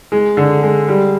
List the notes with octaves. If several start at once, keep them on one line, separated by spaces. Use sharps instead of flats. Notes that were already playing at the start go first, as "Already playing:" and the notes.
G#3
D3
G#3
G3